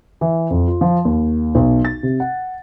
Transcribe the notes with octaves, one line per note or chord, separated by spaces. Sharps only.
E3
F2
F4
F3
D#2
B1
A6
C3
F#5